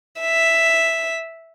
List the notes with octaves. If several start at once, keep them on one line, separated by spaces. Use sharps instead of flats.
E5